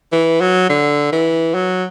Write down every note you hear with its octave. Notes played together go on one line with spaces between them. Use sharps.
E3
F#3
D3
E3
F#3